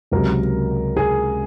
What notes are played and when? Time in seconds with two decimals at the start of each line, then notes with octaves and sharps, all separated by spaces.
0.12 C#2 C3 F#3 A#4
0.97 G#4